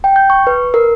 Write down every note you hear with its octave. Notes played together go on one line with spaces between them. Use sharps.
G5
G6
C#6
B4
A#4